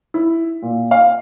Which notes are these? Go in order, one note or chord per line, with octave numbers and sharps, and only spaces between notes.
E4
A#2
F5